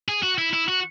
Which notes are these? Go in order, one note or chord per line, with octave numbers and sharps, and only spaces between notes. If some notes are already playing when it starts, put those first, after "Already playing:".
G#4
F#4
E4
E4
F#4